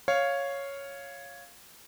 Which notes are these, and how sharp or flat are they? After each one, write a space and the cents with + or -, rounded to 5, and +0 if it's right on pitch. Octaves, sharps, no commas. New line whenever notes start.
C#5 +0 F5 +0